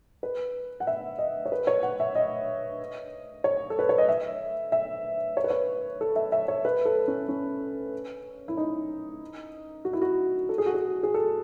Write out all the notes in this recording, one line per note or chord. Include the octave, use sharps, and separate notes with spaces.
B4
F#5
E5
D#5
C#5
B4
C#5
F#5
E5
D#5
C#5
A4
B4
C#5
D#5
E5
E5
C#5
B4
C#5
A4
E5
E5
C#5
B4
A4
C#4
C#4
E4
D#4
F#4
E4
F#4
A4
G#4
F#4
G#4
G#4
A4